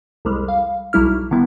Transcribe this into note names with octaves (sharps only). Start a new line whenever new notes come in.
C2 F2 G3 G#3
F5
B1 F#3 G3 E4 F6
D3 D#3 G3 B3 E4